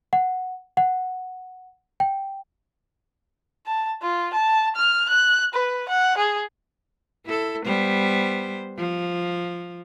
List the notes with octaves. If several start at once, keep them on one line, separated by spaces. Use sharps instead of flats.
F#5
F#5
G5
A5
F4
A5
F6
F#6
B4
F#5
G#4
E4 A4
G3 B3 C5
F3